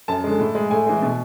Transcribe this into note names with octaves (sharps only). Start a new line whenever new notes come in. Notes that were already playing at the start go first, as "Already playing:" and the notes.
F#2 A5
D3 G#3
A2
G#3
A2 G#5
E3 G#3
B2